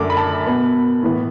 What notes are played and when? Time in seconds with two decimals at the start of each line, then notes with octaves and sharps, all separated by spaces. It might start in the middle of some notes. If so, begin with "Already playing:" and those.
Already playing: F#2 D3 A3 D6
0.10 B5
0.17 A5
0.46 B2 B3 B5
1.03 A2 E3 B3